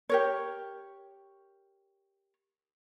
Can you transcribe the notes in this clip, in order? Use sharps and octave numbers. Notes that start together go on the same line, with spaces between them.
G4 A#4 C#5